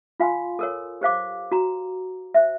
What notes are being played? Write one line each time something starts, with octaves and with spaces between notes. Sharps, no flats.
F4 F5 G#5 C6
A4 A#4 C#5
G4 C5 F5 D6
F#4 A#5
C5 E5